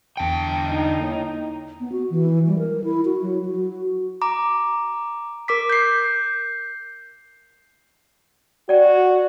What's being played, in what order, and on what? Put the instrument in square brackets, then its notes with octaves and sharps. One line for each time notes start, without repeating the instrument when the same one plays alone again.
[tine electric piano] E2 A5 C#7 [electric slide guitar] D3 G5
[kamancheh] D#4
[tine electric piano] A#3 E4 C#5
[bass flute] B3
F#4
E3
G3
A#4
E4
F#4
F#3
F#4
[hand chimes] A#5 D6
A#4 D6 B6
G6 C7
[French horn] F#4 [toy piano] D5 G5